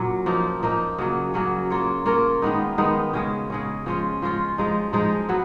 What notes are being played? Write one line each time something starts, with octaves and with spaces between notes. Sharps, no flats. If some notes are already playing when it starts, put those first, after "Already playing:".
Already playing: A#2 F#3 C#4
F3 A#3 D#4
F3 A#3 D#4
C#3 F#3 A#3 C#4
C#3 F#3 A#3 C#4
A#3 F4 A#4 C#5
A#3 F4 A#4 C#5
D#3 G#3 B3 D#4
D#3 G#3 B3 D#4
C#3 G#3 C#4
C#3 G#3 C#4
F3 G#3 C#4 F4
F3 G#3 C#4 F4
F3 G#3 D#4
F3 G#3 D#4
F#3 B3